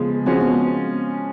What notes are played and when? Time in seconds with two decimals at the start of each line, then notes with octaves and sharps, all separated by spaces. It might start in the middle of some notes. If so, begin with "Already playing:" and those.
Already playing: C#3 F3 G#3 B3
0.26 F3 G#3 C4 C#4 F#4
0.41 B3